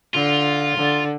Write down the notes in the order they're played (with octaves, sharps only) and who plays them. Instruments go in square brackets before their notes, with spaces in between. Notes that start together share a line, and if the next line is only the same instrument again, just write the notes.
[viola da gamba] D3 [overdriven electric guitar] F4
[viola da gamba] D3